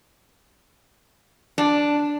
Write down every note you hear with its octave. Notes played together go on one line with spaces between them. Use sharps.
D4